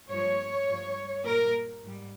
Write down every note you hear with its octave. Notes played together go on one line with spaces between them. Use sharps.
G2 F3 C#5
G2 F3
A#2 G3 A#4
G#2 G3